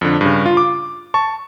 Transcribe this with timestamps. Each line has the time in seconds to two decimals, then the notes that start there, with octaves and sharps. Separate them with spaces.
0.01 F2 D3
0.21 G2 C#3
0.46 F4
0.57 D6
1.14 A5 C#6